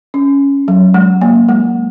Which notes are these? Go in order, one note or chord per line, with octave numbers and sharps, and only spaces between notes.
C#4
F#3
G#3
A#3
G#3